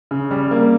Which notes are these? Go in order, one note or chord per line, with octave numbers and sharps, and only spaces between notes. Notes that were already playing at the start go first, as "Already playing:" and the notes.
C#3
G3
A#3